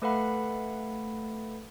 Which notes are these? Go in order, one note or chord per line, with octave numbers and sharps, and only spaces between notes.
A3 A4 B4 F5 F#5 B5